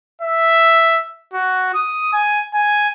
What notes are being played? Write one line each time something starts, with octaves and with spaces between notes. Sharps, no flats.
E5
F#4
D#6
G#5
G#5